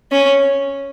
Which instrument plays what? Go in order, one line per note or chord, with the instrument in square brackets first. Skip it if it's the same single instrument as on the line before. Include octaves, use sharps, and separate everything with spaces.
[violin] C#4